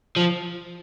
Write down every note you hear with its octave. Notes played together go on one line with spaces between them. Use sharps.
F3